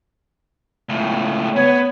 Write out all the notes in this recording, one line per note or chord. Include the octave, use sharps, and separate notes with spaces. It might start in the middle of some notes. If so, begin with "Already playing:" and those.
C#2 A2
B3 C#5